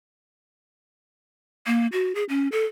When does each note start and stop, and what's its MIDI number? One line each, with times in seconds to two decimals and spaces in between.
1.67 1.87 58
1.92 2.15 66
2.15 2.24 68
2.29 2.48 61
2.52 2.65 69